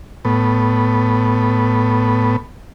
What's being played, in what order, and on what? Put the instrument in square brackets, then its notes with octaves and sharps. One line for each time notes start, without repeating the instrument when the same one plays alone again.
[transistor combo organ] A2 B3